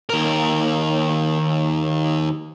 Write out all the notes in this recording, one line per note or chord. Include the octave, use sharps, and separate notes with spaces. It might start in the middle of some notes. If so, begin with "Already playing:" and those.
D#2 A#4